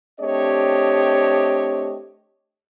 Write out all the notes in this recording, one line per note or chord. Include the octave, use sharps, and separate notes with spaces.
A3 C4 D4 G4 C#5 D#5